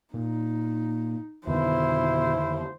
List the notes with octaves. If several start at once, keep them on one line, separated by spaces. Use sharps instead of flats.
A#2 D#4
F2 B2 D3 D#3 E4 C5